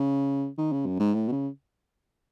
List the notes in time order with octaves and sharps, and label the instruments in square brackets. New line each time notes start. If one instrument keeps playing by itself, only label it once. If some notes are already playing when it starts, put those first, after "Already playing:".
Already playing: [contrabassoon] C#3
D#3
C#3
F#2
G#2
A2
B2
C#3